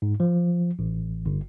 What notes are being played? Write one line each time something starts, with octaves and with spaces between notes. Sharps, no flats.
G#2
F3
A1
G1